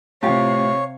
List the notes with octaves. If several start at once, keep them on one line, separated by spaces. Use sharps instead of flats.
A2 C3 F4 G4 C#5 F5